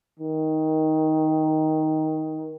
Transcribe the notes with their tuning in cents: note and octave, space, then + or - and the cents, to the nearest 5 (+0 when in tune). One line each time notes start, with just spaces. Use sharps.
D#3 +10